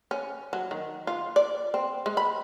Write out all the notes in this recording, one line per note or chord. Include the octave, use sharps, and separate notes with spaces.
C#4
F#3
D#3
F4
D5
C4
G#3
B5